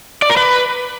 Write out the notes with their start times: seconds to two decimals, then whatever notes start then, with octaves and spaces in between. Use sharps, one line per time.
0.22 D5
0.30 A#4
0.37 B4